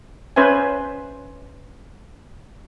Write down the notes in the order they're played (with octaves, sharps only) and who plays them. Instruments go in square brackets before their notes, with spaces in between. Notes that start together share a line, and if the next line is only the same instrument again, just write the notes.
[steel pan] C#4 B4 C5 E5 G#5